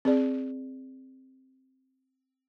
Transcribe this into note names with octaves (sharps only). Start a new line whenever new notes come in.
C4 G#4 D5